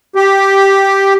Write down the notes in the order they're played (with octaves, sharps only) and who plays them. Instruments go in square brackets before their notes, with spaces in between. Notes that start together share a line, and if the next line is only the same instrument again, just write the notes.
[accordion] G4